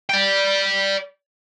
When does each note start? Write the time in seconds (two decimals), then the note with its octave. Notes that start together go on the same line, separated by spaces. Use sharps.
0.10 D5 G5